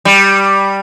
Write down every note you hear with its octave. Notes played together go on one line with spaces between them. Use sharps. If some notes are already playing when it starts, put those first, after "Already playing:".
G3